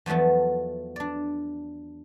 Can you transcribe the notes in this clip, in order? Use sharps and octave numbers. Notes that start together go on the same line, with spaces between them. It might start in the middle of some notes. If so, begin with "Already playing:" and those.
E2 F3 F#3 A3 B3
D4 D5